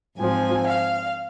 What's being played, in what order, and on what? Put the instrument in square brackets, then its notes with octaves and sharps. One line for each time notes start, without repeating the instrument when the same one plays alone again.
[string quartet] G#2 F3 C4 G#5
F5